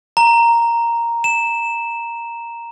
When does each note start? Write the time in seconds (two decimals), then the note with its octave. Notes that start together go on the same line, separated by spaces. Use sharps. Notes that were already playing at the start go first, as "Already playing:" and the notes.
0.17 A#5
1.24 E7